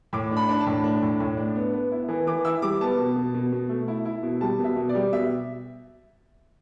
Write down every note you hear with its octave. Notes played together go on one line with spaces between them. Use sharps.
A2 D6
D4
B5
D4 B5
A5
A2
D4
A2
A2
D4
B3
B3
E4
E3
E3 D6
E4 E6
G3 D6
B3 A5
B2
B2
B2
B2
A3
E4
E4
B2
G3 A5
B2
E5
B2
D5
G3
B2 E5